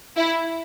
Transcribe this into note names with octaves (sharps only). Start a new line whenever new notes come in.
E4